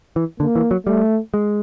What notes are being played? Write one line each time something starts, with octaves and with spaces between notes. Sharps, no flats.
E3
D3 A#3
E3
F#3
G3 A3
G#3